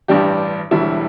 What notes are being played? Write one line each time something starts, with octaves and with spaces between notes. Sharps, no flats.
A1 G2 G3 D4 G4
E1 D2 D3 G3 E4